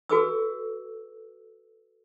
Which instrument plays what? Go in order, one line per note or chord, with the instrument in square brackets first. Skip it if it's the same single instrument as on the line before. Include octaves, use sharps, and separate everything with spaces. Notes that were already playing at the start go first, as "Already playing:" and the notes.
[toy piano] F#4 G#4 A4 B4 D6 E6